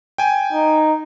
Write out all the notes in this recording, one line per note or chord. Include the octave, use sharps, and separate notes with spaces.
G5 G#5
D#4